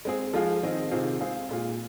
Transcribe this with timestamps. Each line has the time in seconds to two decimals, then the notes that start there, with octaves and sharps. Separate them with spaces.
0.05 G#3 C4 G#4
0.33 F3 G#3 F4 G#4
0.63 D#3 C4 G#4 D#5
0.91 C3 D#3 C4 F4 G#4
1.20 G#3 C4 G#4 F5
1.49 A#2 G#3 F4